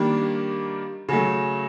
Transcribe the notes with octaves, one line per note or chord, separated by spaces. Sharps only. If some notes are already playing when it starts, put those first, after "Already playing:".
Already playing: D#3 G3 A#3 D4
C#3 F#3 A3